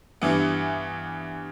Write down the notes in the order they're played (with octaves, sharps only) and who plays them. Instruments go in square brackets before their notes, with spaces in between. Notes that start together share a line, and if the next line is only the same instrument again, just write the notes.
[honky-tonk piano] G2 E3 B3